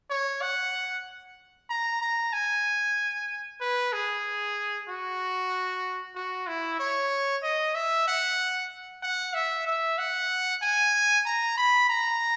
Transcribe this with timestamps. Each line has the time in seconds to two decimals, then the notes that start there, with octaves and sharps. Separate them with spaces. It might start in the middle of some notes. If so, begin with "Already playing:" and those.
0.10 C#5
0.42 F#5
1.70 A#5
2.01 A#5
2.33 G#5
3.61 B4
3.93 G#4
4.88 F#4
6.15 F#4
6.47 E4
6.79 C#5
7.43 D#5
7.75 E5
8.07 F#5
9.03 F#5
9.34 E5
9.66 E5
9.98 F#5
10.62 G#5
11.26 A#5
11.58 B5
11.90 A#5